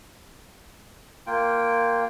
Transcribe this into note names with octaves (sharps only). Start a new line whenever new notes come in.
A#3 F4 G5